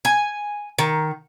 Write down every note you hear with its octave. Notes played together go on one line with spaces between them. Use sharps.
G#5
D#3